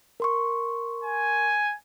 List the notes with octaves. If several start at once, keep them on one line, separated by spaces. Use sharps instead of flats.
A#4 C6 C#6
G#5